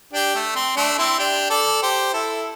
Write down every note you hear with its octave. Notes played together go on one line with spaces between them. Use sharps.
D4 G4
A3
C4
A3 D4
C4 E4
D4 G4
A4 D5
G4 C5
E4 A4